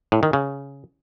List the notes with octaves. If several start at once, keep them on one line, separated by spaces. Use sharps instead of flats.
A2
D#3
C#3